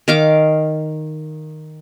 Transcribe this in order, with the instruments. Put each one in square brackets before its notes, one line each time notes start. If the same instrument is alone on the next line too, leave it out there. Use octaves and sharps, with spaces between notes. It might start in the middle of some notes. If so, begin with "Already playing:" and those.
[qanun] D#3 F5 D6